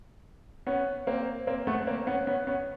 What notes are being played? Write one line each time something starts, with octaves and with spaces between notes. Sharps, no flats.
B3 C#4
A#3 C4
A#3 C4
A3 B3
A#3 C4
B3 C#4
B3 C#4
B3 C#4